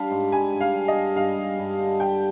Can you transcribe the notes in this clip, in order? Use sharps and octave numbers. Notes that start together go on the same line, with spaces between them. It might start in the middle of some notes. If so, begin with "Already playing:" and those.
Already playing: G3 D4 F5
G#2
G3 G#5
G2
F5
G2
D#5
G2
G2 F5
G2
G2
D3
G3 G5